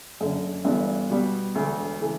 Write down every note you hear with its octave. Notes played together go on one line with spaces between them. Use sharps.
F#1 F#2 D3
G1 G2 E3 B3 D4
B2 G3 B3
E1 D2 D3 A3
C#3 E3 A3